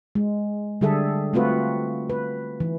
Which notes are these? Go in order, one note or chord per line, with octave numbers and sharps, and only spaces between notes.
G#3
D3 G3 G#4 A4 E5
A3 C4 F4 F#4 B4
B4
E3